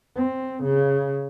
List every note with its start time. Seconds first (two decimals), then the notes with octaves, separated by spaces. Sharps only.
0.16 C4
0.63 C#3